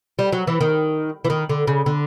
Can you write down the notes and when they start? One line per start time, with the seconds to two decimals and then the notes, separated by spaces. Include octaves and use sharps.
0.19 G3
0.33 F#3
0.47 E3
0.61 D#3
1.25 E3
1.30 D#3
1.50 D3
1.67 C#3
1.86 D3